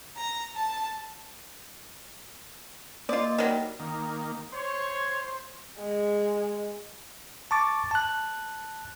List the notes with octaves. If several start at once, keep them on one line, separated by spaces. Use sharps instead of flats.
A#5
A5
A#3 F4 D5 D#5
D#3 F#3 G3
D#3 A#3
C5 C#5
G#3
A5 C#6 D6 A6
A5 F#6